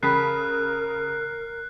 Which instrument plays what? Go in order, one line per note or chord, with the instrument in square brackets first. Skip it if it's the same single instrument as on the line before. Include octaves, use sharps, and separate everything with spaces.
[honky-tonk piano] C#3 [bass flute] A#4 [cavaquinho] A5 B5 [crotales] F#6 C7